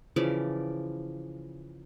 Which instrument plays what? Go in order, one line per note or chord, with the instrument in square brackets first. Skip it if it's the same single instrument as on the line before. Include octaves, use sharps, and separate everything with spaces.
[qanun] C#3 E3 F3 D5